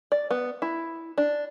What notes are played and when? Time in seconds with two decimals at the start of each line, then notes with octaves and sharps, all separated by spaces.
0.12 D5
0.31 B3
0.62 E4
1.18 D4